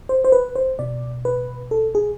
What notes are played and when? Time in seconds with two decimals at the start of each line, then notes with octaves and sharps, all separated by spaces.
0.09 C5
0.24 C5
0.32 B4
0.56 C5
0.79 B2 D5
1.25 B4
1.71 A4
1.95 G#4